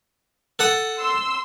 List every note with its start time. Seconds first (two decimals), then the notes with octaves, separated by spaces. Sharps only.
0.59 A4 F#5 D#6
0.98 C6 E6